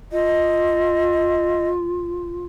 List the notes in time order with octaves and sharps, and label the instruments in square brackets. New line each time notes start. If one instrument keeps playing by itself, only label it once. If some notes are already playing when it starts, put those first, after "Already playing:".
[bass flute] F4 [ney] D#5